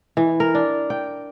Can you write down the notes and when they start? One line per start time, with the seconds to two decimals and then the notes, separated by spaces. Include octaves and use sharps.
0.17 E3
0.40 A#4
0.55 D4
0.90 G5